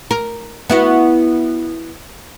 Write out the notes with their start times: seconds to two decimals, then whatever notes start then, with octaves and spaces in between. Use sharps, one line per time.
0.11 A#4
0.70 B3 E4 F#4